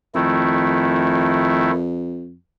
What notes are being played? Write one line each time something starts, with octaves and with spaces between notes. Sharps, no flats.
F2 D#3 A3 E4